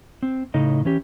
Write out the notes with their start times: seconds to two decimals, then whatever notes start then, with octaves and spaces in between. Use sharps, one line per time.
0.23 C4
0.54 A2 C#3 D#4 A4 D#5
0.85 E3 C#4 G4